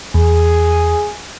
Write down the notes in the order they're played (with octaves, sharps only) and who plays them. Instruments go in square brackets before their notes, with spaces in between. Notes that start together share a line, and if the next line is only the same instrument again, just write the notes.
[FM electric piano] E2 [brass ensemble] G#4